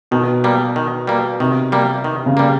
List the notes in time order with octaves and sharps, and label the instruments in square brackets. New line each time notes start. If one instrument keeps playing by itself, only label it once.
[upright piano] B2 [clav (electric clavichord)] D#3
[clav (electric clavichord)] G3 A#3
D#3
G3 A#3
[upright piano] C3 [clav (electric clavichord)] D#3
[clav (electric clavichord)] G3 A#3
D#3
[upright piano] C#3
[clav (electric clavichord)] G3 A#3